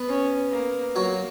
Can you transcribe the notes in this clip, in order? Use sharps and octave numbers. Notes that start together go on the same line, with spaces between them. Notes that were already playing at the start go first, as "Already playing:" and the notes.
Already playing: B3 B4
C#4
A#3
F#3 A#3 F#4